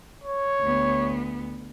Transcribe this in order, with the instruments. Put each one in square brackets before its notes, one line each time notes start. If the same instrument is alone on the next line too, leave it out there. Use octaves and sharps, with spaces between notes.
[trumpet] C#5
[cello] D2 B3